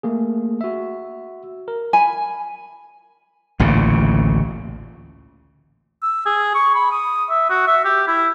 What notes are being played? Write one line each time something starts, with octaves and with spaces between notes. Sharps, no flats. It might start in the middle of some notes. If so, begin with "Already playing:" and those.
A3 A#3 G#4
F#4 E5
A#4
G#5 B5
A1 D2 A#2 C#3
E6
G#4
C#6
B5
D#6
E5
F#4
E5
G4
E4